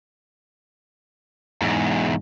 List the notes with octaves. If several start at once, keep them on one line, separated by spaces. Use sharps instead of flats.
E2 G#2